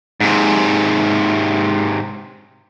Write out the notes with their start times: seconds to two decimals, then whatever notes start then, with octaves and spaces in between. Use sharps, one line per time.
0.20 G#2 C3